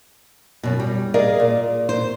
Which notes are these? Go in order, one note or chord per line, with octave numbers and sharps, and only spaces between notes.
F#2 B2
G3
G#4 A#4 D5 D#5 F5
A#2
C5